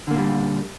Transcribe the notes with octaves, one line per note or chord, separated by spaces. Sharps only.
A#2 D3 G3 A#3